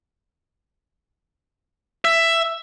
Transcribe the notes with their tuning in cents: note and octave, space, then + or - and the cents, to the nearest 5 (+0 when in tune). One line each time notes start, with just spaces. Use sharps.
E5 +10